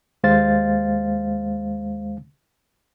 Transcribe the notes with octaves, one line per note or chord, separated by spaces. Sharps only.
D#2 G#3 C5 F5 A6